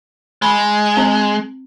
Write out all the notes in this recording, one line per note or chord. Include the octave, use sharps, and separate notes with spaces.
G#3 B5
C4